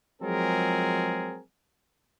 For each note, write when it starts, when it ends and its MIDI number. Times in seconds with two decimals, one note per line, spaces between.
0.22 1.40 53
0.22 1.40 54
0.22 1.40 56
0.22 1.40 60
0.22 1.40 68
0.22 1.40 70